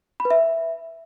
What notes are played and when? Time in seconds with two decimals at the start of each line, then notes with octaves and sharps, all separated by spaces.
0.20 B5
0.25 B4
0.30 E5